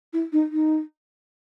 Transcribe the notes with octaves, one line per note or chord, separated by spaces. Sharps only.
E4
D#4
D#4